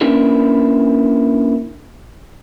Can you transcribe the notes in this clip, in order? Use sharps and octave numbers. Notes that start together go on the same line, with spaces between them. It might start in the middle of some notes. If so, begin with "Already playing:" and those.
A#3 C#4 D4 E4 A#4 B4